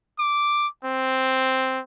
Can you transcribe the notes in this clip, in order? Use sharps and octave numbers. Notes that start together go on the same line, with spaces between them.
D6
C4